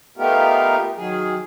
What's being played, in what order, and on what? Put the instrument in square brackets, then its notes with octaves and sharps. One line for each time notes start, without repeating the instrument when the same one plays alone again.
[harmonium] A3 B3 D#4 F4 G4 A#4
D#3 F#3 G#4